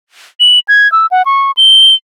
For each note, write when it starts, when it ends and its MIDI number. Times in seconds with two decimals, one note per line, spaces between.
0.40 0.59 102
0.68 0.90 92
0.92 1.06 88
1.11 1.22 78
1.26 1.51 85
1.57 1.94 103